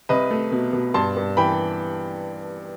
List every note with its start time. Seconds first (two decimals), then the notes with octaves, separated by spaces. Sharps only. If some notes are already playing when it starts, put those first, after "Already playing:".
0.09 C2 B4 D#5
0.30 A3
0.52 B2
0.73 B2
0.94 G2 A5 C6
1.16 G2
1.37 E3 G5 B5